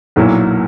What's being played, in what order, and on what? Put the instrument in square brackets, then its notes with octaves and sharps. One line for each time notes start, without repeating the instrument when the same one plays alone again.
[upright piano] B1 A#2 F#3 A#3 E4